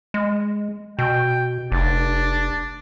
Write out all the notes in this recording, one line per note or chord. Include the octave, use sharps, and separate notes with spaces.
G#3
B2 G5
F1 D4